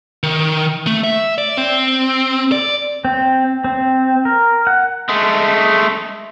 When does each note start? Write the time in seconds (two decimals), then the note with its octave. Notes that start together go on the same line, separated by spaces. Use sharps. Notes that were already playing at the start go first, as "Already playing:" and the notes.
0.23 D#3
0.87 A3
1.04 E5
1.38 D5
1.58 C4
2.52 D5
3.05 C4
3.64 C4
4.25 A#4
4.67 F#5
5.09 G#3 A3